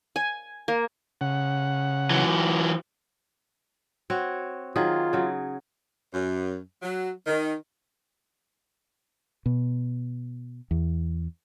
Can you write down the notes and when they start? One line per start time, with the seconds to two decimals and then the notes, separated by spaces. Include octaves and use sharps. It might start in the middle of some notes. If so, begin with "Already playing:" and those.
0.16 G#5
0.68 A#3
1.21 C#3 F#5
2.10 E3 F#3
4.10 C4 F#4 C#5
4.76 D#3 F#3 F4 G#4
5.13 C#3 F#3
6.14 F#2
6.82 F#3
7.27 D#3
9.46 B2
10.71 E2